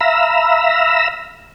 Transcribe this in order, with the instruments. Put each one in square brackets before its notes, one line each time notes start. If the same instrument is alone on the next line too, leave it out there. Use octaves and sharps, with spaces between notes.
[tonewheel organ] E5 F5 A#5 B5 E6